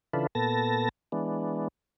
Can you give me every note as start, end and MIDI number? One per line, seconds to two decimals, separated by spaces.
0.13 0.27 49
0.13 0.27 52
0.13 0.27 62
0.13 0.27 65
0.13 0.27 69
0.13 0.27 71
0.35 0.89 46
0.35 0.89 59
0.35 0.89 69
0.35 0.89 81
0.35 0.89 94
1.12 1.68 52
1.12 1.68 56
1.12 1.68 59
1.12 1.68 62